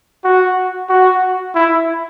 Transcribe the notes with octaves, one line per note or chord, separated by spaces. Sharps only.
F#4
F#4
E4